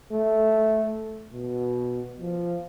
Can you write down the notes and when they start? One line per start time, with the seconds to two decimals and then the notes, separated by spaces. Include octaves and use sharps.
0.12 A3
1.34 B2
2.20 F3